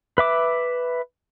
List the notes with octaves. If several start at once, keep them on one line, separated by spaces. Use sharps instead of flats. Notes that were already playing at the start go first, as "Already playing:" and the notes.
B4 E5 D6